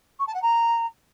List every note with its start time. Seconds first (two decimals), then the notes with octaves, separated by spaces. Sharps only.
0.19 C#6
0.27 A5
0.34 F#5
0.42 A#5